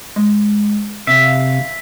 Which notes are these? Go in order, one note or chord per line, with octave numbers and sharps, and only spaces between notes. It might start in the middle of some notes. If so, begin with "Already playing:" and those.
G#3
C3 E5 F5